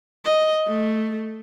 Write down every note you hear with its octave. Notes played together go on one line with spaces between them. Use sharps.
D#5
A3